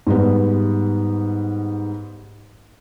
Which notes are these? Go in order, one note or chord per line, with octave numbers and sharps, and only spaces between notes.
G#2 G3 B3